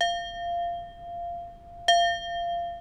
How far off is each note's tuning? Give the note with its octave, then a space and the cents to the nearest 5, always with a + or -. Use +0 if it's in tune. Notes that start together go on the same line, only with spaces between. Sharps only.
F5 -15
F5 -20